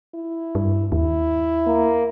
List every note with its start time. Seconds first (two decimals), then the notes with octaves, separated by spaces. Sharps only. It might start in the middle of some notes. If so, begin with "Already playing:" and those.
0.14 E4
0.55 G2
0.92 D#2 E4
1.67 A#3